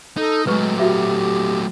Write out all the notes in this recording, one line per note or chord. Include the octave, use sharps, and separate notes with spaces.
D#4 A4
F#3 G#3 A3 B4 C#6
F#4 G4 E5 D6